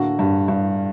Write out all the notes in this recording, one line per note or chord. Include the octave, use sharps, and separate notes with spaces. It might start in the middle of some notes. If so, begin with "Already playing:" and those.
Already playing: A2 D3 A#3 F#4
G2
G2